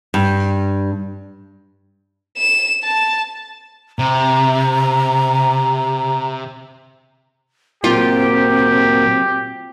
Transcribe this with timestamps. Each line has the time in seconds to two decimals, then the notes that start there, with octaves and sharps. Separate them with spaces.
0.14 G2
2.37 E7
2.84 A5
3.99 C3 A#5
7.84 A#2 F#3 A#3 C4 F4 G4